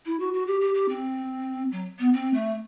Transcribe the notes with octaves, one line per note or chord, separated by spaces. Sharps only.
E4
F#4
F#4
G4
G4
G4
C4
F#3
B3
C4
A3